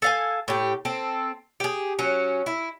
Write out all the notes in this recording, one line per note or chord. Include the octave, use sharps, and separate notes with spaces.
A4 F5 G#5
A2 G4
C4 A4
G4 G#4
F#3 C#4
E4